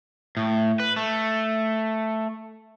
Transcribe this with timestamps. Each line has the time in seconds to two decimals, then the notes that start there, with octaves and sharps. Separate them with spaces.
0.37 A2
0.80 B4
0.97 A3